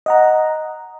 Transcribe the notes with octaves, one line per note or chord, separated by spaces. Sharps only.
D#5 F#5 A#5